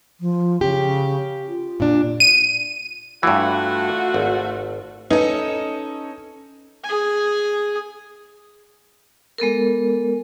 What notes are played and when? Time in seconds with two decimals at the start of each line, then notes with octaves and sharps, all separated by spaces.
0.21 F3
0.61 C#3 G4
1.48 F4
1.80 A#2 D4
2.20 D#7
3.23 G2 E3 A3 F4 F#4
4.14 G#1
5.11 C#4 D#4 A4 B4
6.84 G#4 G#5
9.38 G#3 B3 A4 A#4